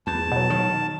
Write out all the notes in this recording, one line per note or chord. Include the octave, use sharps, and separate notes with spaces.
E2 A5
B2 F#3
D#3